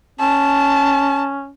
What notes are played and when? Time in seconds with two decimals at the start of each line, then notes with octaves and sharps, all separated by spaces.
0.20 C#4 A5